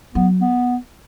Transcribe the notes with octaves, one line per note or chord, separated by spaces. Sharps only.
F#3 B3
B3